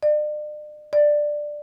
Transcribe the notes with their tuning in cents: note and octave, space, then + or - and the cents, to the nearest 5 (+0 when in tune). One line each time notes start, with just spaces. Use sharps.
D5 +40
D5 +10